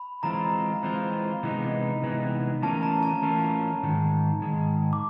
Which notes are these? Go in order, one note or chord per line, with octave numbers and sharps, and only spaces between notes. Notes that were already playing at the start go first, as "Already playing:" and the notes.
Already playing: B5
E3 G#3 C4 F4 A#5
E3 G#3 C4 F4
C3 E3 G#3 B3 D#4
C3 E3 G#3 B3 D#4
E3 A3 C#4 F4 A#4 A5
A#5
A5
E3 A3 C#4 F4 A#4
G#2 D#3 G#3
G#2 D#3 G#3
D6